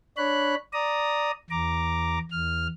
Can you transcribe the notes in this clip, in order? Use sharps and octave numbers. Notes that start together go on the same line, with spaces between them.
D4 C#5 B5 F#6
D5 A#5 D#6
E2 A#5 D6
E2 F6